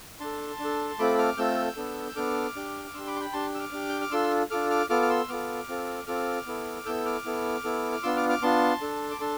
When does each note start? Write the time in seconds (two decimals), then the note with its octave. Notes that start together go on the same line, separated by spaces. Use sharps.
0.20 D4 A4 A5 C6
0.59 D4
0.64 A4
0.99 A3 C4 F4 A4 B5 D6
1.18 D6 F6
1.37 A3 C4 F4 A4 E6 G6
1.77 B3 D4 A4
2.09 E6
2.16 B3 D4 A4 D6 F6
2.56 D4 G4
2.94 D4 G4 C6 E6
3.07 B5 D6
3.16 C6
3.20 G5 B5
3.33 D4 G4 A5 C6
3.55 E6
3.59 D6 F6
3.72 D4 G4
3.89 G6
4.01 F6
4.11 D4 F4 A4 C6 E6
4.50 D4 F4 A4 D6 F6
4.70 D6 F6
4.90 B3 F4 A4 D6 F6
5.02 F6
5.10 C6 E6
5.29 B3 F4 A4 D6 F6
5.69 C4 F4 A4
6.07 C4 F4 A4 D6 F6
6.47 B3 E4 A4
6.85 B3 E4 A4 E6 G6
7.05 D6 F6
7.25 B3 E4 A4
7.64 B3 E4 A4
7.92 F6
8.03 B3 D4 F4 C6 E6
8.16 D6 F6
8.29 D6 F6
8.42 B3 D4 F4 A5 C6
8.81 D4 A4
9.11 D6
9.20 D4 A4 A5 C6